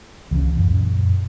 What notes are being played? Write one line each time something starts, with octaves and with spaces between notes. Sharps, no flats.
C#2 E3 G#3 C#4
F#2 A#2